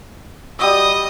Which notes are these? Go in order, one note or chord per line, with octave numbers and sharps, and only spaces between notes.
G3 F#4 D#5 D#6 E6